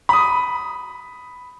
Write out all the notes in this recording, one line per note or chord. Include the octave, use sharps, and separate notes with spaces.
B5 D#6